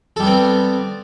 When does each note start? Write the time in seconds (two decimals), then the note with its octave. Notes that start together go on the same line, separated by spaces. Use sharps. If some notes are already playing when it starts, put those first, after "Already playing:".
0.16 A4
0.20 G3
0.23 B3
0.27 C4